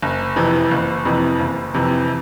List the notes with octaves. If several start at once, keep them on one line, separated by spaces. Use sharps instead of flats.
F#1
F2 C3 E3
F#1
F2 C3 E3
F#1
F2 C3 E3